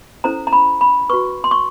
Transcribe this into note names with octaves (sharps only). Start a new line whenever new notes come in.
C#4 E4 A4 C5 A#5
A#5
B5
B5
F#4 B4 C#6
C6
C#6